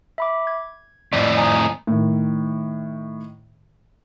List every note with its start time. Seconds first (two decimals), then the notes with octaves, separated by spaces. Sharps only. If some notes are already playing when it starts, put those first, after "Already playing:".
0.18 E5 B5 D6
0.47 G#6
1.13 F2 A2 D5 D#5
1.37 G#5 A#5 D#6
1.87 A2 D#3